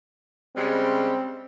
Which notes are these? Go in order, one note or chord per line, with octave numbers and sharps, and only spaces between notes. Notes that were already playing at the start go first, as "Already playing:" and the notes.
C#3 G3 G#3 C4